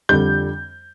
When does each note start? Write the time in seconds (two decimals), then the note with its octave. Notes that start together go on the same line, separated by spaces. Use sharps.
0.09 F2 D3 G3 G6